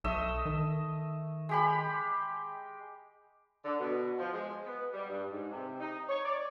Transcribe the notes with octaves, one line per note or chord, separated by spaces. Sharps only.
B1 A3 D#5 E6
D#3
G#3 G4 B5
D3
B2
F3
G#3
B3
G3
G2
G#2
C3
D#4
C#5
D5